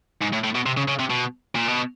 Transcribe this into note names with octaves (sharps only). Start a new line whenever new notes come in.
G#2
A2
A2
B2
C3
C#3
C#3
C3
B2
A#2
B2